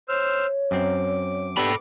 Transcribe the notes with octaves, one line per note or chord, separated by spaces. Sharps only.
C5 C#5 E6 F6
F#2 C4 D6
B3 D4 G4 A4 B5